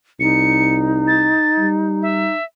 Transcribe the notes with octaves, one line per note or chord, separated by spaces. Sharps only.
C2 D#4 C#7
A6
G3
E5